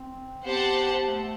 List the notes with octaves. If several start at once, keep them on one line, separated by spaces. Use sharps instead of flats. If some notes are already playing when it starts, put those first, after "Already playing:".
Already playing: C4
B3 G4 C5 F#5 A5
A3